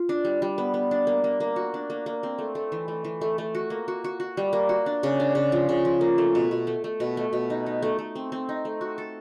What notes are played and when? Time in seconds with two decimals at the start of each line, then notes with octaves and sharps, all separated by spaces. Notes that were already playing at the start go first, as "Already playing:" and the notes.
Already playing: F4
0.09 D4
0.25 G3
0.42 G3
0.58 B3
0.74 B3
0.91 D4
1.07 A#3
1.24 A#3
1.40 A#3
1.56 F#4
1.74 D4
1.90 A#3
2.06 A#3
2.23 C4
2.38 A3
2.55 A3
2.72 E3
2.88 A3
3.04 E3
3.21 A3
3.38 A3
3.55 F#4
3.70 A#3
3.88 F#4
4.04 F#4
4.20 F#4
4.37 G3
4.53 A#3
4.69 F#4
4.86 D4
5.03 C#3
5.20 D4
5.35 C#3
5.52 F3
5.69 C#3
5.85 F3
6.01 A#3
6.18 A3
6.35 B2
6.51 B2
6.67 A3
6.84 A3
7.00 B2
7.17 A3
7.33 B2
7.50 D#4
7.66 D#4
7.82 A3
7.99 A3
8.15 C4
8.32 C4
8.49 D#4
8.65 A3
8.81 F#4
8.98 A4